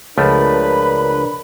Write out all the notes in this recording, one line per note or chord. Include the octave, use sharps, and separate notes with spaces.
C#2 F3 A3 D4 A#4 B4 B5